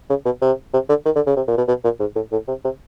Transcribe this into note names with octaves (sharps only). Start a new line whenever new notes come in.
C#3
B2
C3
C3
D3
D#3
D3
C#3
C3
A#2
B2
B2
A#2
G#2
A2
A2
C3
C3